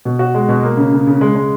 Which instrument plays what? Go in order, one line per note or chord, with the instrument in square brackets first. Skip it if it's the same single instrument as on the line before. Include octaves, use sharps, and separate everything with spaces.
[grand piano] B2
F#4
G#3
B2
A#3
C#3
C#3
C#3
G#3
G#3